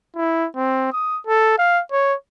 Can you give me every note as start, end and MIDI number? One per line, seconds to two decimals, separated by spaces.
0.16 0.47 64
0.56 0.91 60
0.93 1.19 87
1.27 1.55 69
1.58 1.81 77
1.92 2.14 73